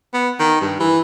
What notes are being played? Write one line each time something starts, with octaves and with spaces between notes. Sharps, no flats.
B3
D#3
G2
E3